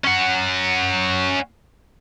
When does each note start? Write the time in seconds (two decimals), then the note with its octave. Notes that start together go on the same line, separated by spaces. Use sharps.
0.04 C#4 F#5